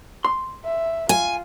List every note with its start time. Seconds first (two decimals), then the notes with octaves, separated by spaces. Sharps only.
0.25 C6
0.65 E5
1.09 F4 G#5